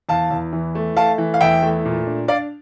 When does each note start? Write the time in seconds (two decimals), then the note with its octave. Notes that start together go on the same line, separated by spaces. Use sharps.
0.09 E2 F5 A5
0.31 E2
0.53 E3
0.75 A3
0.97 A3 F5 A5
1.18 E3
1.34 F5
1.41 E2 E5 G5
1.62 A3
1.85 A#2
2.07 D4
2.28 D4 D5 F5